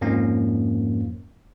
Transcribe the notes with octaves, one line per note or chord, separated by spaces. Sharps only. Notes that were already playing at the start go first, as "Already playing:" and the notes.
F2 G#2 F3 A#3 C#4